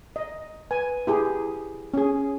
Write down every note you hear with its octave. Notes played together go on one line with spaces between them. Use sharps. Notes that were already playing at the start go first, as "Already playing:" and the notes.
D#5
B4 G#5
E4 G4 G#4
C#4 G#4